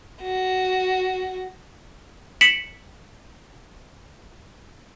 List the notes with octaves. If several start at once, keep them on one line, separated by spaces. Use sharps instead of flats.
F#4
B6 C#7 D7 E7 F#7